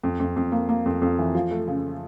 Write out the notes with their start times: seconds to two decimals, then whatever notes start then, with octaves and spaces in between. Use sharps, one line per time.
0.03 F2
0.20 F2
0.36 F2
0.52 A#3
0.69 A#3
0.86 F2
1.02 F2
1.19 E3
1.34 F3
1.51 A3
1.68 C#3